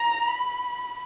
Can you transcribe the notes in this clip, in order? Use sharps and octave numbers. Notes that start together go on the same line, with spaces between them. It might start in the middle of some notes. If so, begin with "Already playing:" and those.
Already playing: A#5
B5